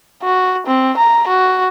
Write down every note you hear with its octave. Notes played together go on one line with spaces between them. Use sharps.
F#4
C4
A#5
F#4